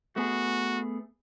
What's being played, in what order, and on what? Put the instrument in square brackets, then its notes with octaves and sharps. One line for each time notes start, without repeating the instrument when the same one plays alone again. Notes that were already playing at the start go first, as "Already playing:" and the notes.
[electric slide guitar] A3 B3 G#4 [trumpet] F#4